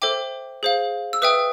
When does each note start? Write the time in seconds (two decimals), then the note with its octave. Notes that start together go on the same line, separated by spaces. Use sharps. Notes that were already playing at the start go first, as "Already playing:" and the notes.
0.02 A4 C5 E5 G5 D6
0.63 G#4 C5 F5
1.13 E6
1.22 B4 E5 G5 D#6